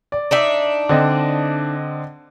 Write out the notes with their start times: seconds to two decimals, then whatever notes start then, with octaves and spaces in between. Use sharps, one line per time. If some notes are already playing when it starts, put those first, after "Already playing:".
0.12 D5
0.31 D4 D#4 E5
0.89 D3 C4 D#5